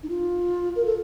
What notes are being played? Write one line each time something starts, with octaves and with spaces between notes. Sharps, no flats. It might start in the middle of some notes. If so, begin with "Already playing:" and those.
D#4
F4
A#4
A4